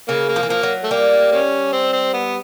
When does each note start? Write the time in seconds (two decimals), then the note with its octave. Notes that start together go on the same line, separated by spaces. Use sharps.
0.08 C#3 A#3
0.29 A#3
0.36 F3
0.43 E3
0.49 F3 A#3
0.63 F#3
0.84 A3
0.91 G3 A#3
1.32 A#3 C#4
1.72 C4
1.93 C4
2.13 B3